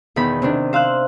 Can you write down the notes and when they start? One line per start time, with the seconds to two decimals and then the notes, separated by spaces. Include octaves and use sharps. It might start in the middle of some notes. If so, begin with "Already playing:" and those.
0.16 E2 B2 D#3 B5
0.42 C3 D#3 D4
0.73 C5 F5 E6 F#6